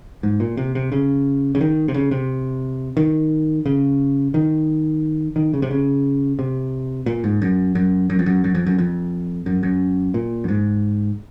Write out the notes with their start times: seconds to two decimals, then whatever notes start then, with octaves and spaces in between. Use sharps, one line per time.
0.23 G#2
0.40 A#2
0.57 C3
0.75 C3
0.92 C#3
1.55 C#3
1.61 D#3
1.88 C3
1.94 C#3
2.11 C3
2.97 D#3
3.66 C#3
4.34 D#3
5.36 D#3
5.54 C#3
5.62 C3
5.71 C#3
6.39 C3
7.06 A#2
7.24 G#2
7.42 F#2
7.75 F#2
8.10 F#2
8.19 F2
8.26 F#2
8.44 F#2
8.55 F2
8.67 F#2
8.78 F2
9.46 F#2
9.63 F#2
10.14 A#2
10.44 F#2
10.48 G#2